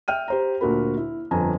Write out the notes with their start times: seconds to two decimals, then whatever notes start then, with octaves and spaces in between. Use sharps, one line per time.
0.08 E5 G5 F6 D#7
0.28 G4 C5 A#5
0.61 D2 A#2 F#4 A#4 B5
0.97 E4
1.31 G1 F2 G#5 A#5